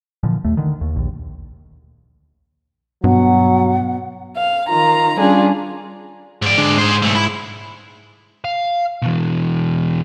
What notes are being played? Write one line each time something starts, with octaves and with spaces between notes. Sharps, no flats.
A#2 D3 E3 F3
D#2 A3
D3 D#3
D#2
A#1 D#2
G2 B2 F#3 F#5
F5
D#3 F4 A#5
G3 C#4 D4 F4 G#4
G#2 D5
D3 G#3 D4
G#2 G#4 C5
B1 A3
E4
F5
B2 E3